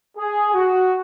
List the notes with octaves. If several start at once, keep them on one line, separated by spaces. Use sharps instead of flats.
G#4
F#4